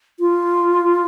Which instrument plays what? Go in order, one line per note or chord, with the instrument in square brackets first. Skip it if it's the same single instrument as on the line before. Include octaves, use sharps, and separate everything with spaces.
[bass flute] F4